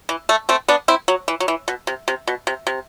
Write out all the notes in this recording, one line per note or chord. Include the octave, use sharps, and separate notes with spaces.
E3
A3
A3 C4
B3 D4
C4 E4
F#3
E3
F#3
E3
B2
C3
C3
B2
C3
C3